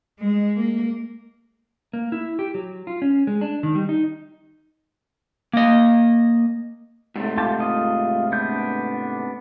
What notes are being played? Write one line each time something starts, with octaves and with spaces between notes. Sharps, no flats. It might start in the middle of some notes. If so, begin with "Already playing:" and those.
G#3
A#3
A#3
E4
G4
F#3
F4
C#4
G#3
D4
D#3
G3
D#4
A#3 D#5
G#2 C3 A3
F4 G4 A5
F4 D#5
B3 D4 G6